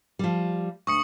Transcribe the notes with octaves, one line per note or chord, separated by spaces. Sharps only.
F3 G3
D2 C#6 D#6 C#7